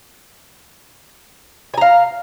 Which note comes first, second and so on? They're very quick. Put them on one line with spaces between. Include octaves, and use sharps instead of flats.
G#5 A#5 F5